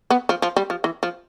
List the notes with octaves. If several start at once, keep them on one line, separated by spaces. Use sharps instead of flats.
B3
F3
F3
G3
F3
E3
F3